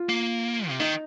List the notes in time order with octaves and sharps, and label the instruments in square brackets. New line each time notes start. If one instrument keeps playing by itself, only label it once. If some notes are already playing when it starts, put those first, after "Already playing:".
Already playing: [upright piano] F4
[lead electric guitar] A#3
C3
[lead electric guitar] D#3 [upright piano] D#4